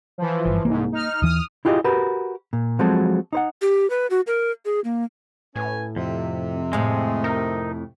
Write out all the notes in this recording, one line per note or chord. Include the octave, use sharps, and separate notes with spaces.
E3 F3
G1
C2 G#2 A#3
D#4 F6
D#2 E3 D#6 F6
E4 F4 G4 G#4 C#5 D#5
F#4 G4 A#4 B4
A#2
F3 F#3 G#3 C4 F#4 A4
D#4 C5 F#5
G4
B4
F#4
A#4
G#4
A#3
A2 C#4 B4 G#5
F2 C3
F2 A2 G#3
D#4 A#4